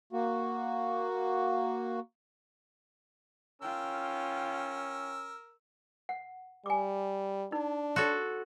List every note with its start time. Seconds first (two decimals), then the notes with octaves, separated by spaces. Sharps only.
0.13 A#3 F#4
3.62 C#4 F4 A#4 G5 E6
6.09 F#5
6.66 G3 G#5 D6
7.52 D4 D#4
7.96 F#4 A4 C#5 C6